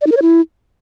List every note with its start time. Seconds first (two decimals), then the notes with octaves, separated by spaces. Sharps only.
0.01 D5
0.07 D#4
0.12 A#4
0.17 C#5
0.22 E4